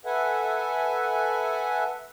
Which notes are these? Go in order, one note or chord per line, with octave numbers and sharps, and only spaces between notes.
A4 B4 E5 F#5 G#5